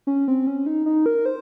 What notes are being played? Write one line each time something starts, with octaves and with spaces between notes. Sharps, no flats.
C#4
C4
C#4
D#4
D#4
A#4
C5